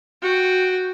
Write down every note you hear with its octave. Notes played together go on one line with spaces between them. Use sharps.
F#4 G5